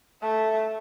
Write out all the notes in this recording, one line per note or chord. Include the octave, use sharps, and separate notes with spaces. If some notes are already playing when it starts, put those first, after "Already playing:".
A3 E5